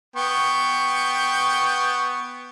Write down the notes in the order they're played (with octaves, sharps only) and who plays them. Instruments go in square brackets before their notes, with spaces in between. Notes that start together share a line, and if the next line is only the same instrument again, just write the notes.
[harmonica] B3 G5 C#6